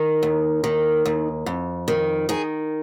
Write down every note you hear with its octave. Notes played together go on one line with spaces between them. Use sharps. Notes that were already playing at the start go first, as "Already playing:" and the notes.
Already playing: D#3
D#2
D#3
D#2
F2
D#3
D#3 G#4